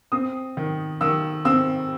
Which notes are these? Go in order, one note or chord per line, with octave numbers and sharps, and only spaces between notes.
C4 D#6
D#3
D#3 E6
C4 E6